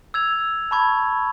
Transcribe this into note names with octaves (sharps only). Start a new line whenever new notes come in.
E6 G#6 F7
A5 B5 C#6 G#6